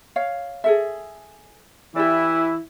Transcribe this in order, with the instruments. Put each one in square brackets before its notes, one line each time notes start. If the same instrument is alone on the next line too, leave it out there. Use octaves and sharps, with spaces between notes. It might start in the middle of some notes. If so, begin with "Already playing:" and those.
[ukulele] C#5 F5
G#4 A4 E5
[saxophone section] E3 E4 [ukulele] G4 D5